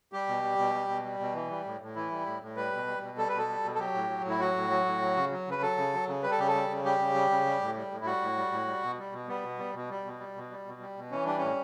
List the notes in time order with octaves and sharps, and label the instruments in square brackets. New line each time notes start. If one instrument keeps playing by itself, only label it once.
[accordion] G3 G4
B2
G3
B2
G3
B2
G3
B2
E3
G3
A2
A2
E3 E4
G3
A2
A2
G3 B4
B2
G3
B2
G3 A4
B2 B4
A4
G3
B2
A4
F#3 G4
A2
F#3
A2 E4
F#3 F#4
A2
F#3
A2
F#3
C#3
F#3
C#3 B4
F#3 A4
C#3
F#3
C#3
G3 B4
A4
C#3 G4
A4
G3
C#3
G3 G4
C#3
G3
C#3
G3
A2
G3
A2
E4
G3 F#4
A2
G3
A2
G3
B2
G3
B2
G3 B3
B2
G3
B2
G3
B2
G3
B2
G3
B2
G3
B2
E3 C#4
G3 D4
A2 C#4